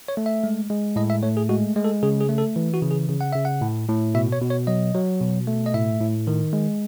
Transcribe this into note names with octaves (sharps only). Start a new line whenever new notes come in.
C#5
A3
E5
G#3
G#3
A2 D#5
E5
A3 C#5
G#4
G#3 F#4
G#3
A4
C#3 G#4
G#4
A3
A4
E3
F#4
C#3
G#4
C#3
F#5
C#3 E5
F#5
A2
A2
B2 E5
C#5
B2
C#5
F#3 D#5
F#3
B2
A3
D#5
A2 E5
A2
D#3
G#3